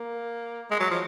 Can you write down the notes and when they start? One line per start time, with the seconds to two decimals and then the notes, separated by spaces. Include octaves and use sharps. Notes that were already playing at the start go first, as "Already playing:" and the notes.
Already playing: A#3
0.71 G#3
0.80 F#3
0.90 F3